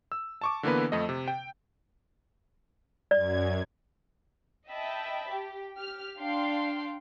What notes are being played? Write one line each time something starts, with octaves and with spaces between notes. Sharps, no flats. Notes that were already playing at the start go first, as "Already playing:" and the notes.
E6
A5 C#6 D6
D3 E3 A#3 B3 B4
F2 A3 D#5
C3
G5
F#2 D5 G#6
D#5 E5 G5 A5 B5
G4 G5
G4 F6
D4 F5 G5 C6